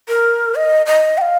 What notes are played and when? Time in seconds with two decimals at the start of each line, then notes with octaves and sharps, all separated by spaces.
0.08 A#4
0.55 D#5
0.86 D#5
1.18 G5
1.21 F5